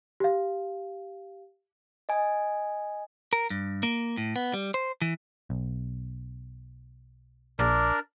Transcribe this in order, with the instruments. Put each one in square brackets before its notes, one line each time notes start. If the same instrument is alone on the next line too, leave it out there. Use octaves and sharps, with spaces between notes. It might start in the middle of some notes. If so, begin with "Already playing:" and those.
[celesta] G4 F5
[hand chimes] D#5 G#5
[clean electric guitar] A#4
G2
A#3
A2
B3
G3
C5
E3
[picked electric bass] B1
[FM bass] A#1 [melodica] D4 A#4 D5